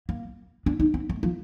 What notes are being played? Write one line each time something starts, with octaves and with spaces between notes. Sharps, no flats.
A#3
D4
D#4
C4
A3
F3